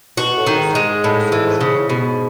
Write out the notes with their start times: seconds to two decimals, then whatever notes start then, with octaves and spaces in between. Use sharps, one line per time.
0.17 B2 F#4
0.37 A2
0.47 D#3
0.56 G#2
0.75 G#3
1.04 A2
1.32 E3
1.61 C#3
1.89 G#2 B2